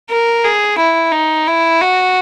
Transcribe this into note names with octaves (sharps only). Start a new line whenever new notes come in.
A#4
G#4
E4
D#4
E4
F#4